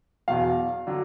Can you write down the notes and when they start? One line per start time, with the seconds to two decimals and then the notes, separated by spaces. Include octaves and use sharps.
0.28 E2 B2 F#3 F5
0.87 D3 F#3